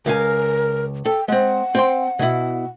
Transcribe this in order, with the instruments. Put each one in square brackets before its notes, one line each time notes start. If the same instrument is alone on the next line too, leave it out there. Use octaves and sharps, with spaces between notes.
[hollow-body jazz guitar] C#2 F5 G#5 [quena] A#4
[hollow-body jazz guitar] A4 [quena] G5
[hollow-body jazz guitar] G#3 C4 [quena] F#5
[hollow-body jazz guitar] C4 G5 C6
B2 E4